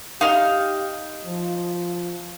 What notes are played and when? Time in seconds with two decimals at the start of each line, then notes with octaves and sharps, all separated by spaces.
0.21 D#4 G4 F5 F6
1.25 F3